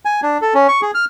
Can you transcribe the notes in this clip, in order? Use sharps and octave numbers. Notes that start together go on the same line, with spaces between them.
G#5
D4
A4
C#4
C#6
G#4
F6